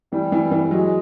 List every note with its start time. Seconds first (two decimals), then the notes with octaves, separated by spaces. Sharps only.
0.12 E3 G3
0.32 E3
0.51 E3
0.71 F#3 G#3